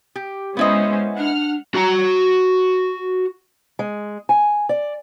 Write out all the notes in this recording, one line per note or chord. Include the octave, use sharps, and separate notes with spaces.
G4
G#3 B3 C#4 E4 C5 D#5
D4 F#5 F6
F#4 A#5
G#3
G#5
D5